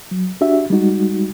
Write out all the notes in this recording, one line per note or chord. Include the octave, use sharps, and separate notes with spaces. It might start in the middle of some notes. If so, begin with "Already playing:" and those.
F#3
D4 F#4 G4 E5
G3 G#3 D#4 F#4